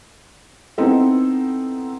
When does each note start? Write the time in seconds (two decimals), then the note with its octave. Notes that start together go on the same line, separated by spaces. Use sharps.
0.78 B3 C4 D#4 E4 A4